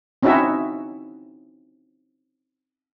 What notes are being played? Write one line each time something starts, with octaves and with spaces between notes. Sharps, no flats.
C4 C#4 D#4 E4 F#4 E5